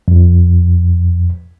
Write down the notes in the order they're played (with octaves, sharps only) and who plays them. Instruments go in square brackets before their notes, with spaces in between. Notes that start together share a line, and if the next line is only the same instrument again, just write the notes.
[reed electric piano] F2